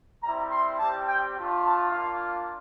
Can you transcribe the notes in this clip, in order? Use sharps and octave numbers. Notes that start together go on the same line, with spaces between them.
G3 C4 E4 A#5
C6
G3 C4 G4 A5
G5
A3 D4 F4
A5
A#3 D4 F4 F5